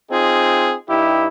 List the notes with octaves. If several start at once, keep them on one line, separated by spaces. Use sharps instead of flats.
C4 D#4 F4 G#4
G2 D#4 E4 G4